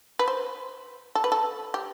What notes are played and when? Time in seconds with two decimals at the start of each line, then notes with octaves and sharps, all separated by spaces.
0.19 B4
0.28 C5
1.15 A4
1.24 B4
1.32 A4
1.74 G4